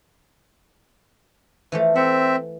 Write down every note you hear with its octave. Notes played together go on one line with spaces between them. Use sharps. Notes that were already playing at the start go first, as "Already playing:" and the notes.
E3 F3 A3
C4 E5 F#5